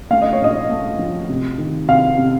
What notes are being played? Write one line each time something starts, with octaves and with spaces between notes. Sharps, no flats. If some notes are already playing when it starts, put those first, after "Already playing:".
A3 F5
D#5
C#5
A#1 D#5
A3
F3
C3
D#3
C3 F5
C3